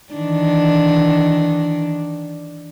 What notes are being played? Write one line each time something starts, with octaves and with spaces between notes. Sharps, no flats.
D#3 E3 D4